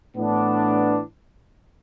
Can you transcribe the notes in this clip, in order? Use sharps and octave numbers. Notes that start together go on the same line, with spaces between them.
A2 E3 B3 D4